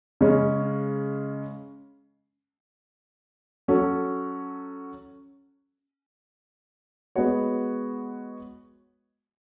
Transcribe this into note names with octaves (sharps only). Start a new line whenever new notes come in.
C#3 G#3 C#4
F#3 C#4 F#4 A4
G#3 B3 F#4 C#5